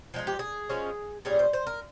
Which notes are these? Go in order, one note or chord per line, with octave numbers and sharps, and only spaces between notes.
F3 G#3 D#4 G#4
G4
G#4
F3 G#3 C#4
A#2 G3 C#4 G#4
C5
C5
A#4